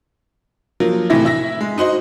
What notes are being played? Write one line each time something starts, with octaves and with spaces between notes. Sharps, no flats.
F3 F#3 A#3
A2 C3 E3 E5 A#6
E4 E5 A#6
G#3
D#4 F#4 C5 D#5